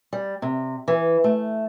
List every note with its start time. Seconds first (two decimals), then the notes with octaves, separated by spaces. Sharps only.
0.13 G3
0.42 C3
0.88 E3
1.24 A3